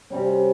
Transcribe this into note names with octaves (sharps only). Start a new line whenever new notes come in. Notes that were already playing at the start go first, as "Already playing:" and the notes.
C3 G3 C#4